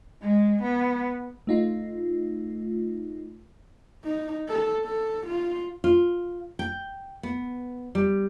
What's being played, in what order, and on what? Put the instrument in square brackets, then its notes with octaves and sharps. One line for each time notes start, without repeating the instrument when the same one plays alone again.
[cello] G#3
B3
[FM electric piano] A3 D#4 F4
[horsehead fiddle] D#4
A4
A4
F4
[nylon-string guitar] F4
G5
B3
G3